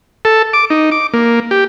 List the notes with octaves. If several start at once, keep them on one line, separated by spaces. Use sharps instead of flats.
A4
D6
D#4
D6
A#3
G4